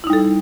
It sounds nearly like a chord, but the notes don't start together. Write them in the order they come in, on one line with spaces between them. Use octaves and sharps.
E4 D#4 G3 A4